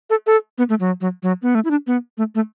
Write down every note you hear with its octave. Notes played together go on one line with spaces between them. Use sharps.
A4
A4
B3
A3
F#3
F#3
F#3
B3
A3
E4
D4
B3
A3
A3